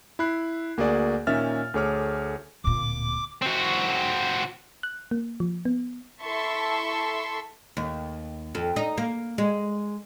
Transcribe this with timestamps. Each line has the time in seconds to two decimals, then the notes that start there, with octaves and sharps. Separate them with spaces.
0.19 E4 B5 F#6 C7
0.77 D2 A#3 F#4 G#4 D5
1.27 A#2 D#3 C#4 E5 F6 A6
1.74 D2 A3 G#4 C#5 D6 F6
2.64 D1 A#2 D6
3.42 C4 F#4
4.83 F#6
5.11 A#3
5.40 F3
5.65 B3
6.21 E4 A4 E5 A5 C6 C#6
7.77 D#2
8.55 F2
8.76 D#4
8.98 A#3
9.38 G#3